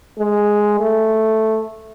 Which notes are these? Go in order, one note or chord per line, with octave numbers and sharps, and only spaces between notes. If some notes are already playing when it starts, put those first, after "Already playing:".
G#3
A3